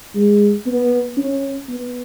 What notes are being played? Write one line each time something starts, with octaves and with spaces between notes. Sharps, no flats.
G#3
B3
C#4
B3